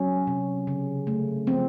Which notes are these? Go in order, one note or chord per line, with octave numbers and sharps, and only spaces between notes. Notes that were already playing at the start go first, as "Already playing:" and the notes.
Already playing: F#3 C#4
C3
C#3
A3
F3 C4